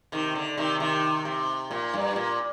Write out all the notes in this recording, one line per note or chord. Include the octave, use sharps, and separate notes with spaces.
C3 D#3
D3
C3 D#3
C3 D#3
C3
A#2
G2
A#2